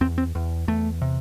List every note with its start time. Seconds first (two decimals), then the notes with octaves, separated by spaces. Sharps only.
0.01 E2 C4
0.18 C4
0.35 E2
0.68 E2 A3
1.02 C3